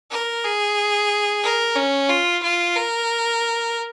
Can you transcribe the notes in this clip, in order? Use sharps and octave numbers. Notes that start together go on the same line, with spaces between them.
A#4
G#4
A#4
C#4
F4
F4
A#4